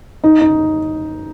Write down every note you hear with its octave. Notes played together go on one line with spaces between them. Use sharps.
D#4
D#4